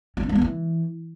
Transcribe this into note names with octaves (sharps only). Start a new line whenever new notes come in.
C#4
D4
G#3
B3
E3